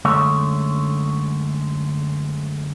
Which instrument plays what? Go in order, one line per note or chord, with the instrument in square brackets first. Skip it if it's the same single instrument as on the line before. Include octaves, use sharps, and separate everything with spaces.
[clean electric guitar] F#2 D3 G#3 A3 C#5